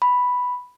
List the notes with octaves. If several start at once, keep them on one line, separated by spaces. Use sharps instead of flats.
B5